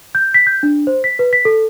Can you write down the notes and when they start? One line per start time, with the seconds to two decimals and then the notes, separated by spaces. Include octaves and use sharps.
0.15 G6
0.34 B6
0.47 G6
0.63 D4
0.87 C5
1.04 B6
1.19 B4
1.33 B6
1.45 A4